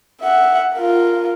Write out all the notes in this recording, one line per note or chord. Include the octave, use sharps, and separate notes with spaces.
E5 F#5
F4 A#4